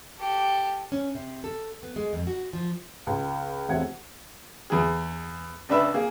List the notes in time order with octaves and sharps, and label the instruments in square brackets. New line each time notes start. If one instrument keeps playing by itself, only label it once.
[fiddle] G4 A4
[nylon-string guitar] C#4
C3
A4
B3
G#3
F2
F#4
F3
[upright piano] C#2
E1 C3 A3 F4 F#5 G#6
[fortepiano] E2 G#4
C#2 D4 B4 E5
A#3 G#4